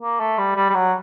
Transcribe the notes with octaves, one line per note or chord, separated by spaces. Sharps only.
A#3
A3
G3
G3
G3
F#3